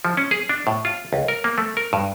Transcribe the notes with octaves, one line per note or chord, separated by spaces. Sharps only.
F3
C#4
G#4
D4
A2
F4
C#2
A#4
A#3
A3
A#4
G2